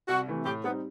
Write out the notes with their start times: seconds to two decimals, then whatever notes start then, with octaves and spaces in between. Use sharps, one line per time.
0.08 C2 F#4
0.27 C3 E3 A3 E4
0.45 A2 G4
0.64 G3 B3 C4 D#4